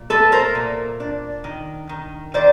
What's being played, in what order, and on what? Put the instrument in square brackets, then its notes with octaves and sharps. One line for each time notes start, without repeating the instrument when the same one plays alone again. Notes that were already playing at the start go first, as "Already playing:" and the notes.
Already playing: [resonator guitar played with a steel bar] A#2
A3 A4 B4
A#4 C5
A#2
D4
D#3
D#3
D#3 C5 D5